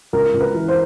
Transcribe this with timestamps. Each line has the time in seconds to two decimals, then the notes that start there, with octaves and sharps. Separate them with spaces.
0.13 C#2 A#4
0.34 C#2
0.41 B4
0.54 E3
0.68 C5